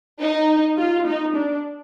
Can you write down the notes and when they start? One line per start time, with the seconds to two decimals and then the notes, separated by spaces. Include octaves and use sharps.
0.21 D#4
0.78 F4
1.07 D#4
1.36 D4